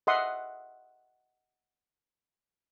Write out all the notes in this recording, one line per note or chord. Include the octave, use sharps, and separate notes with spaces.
D#5 E5 F#5 C6 D#6